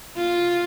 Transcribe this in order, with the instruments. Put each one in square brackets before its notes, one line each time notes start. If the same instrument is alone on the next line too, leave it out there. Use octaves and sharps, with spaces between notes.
[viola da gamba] F4